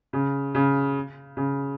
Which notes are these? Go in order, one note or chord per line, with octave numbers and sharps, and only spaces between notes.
C#3
C#3
C#3